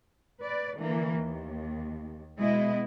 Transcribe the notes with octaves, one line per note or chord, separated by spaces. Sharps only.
B4 D5
D3 E3 A#3
D#2
B2 G#3 B3 E4 D#5